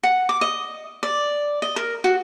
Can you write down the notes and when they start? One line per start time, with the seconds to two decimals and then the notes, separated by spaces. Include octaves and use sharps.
0.03 F#5
0.29 D6
0.41 D#5
1.03 D5
1.62 D#5
1.76 A#4
2.04 F#4